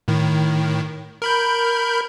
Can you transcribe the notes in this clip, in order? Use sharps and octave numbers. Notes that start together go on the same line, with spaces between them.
A2 D#3
A#4 B5 G6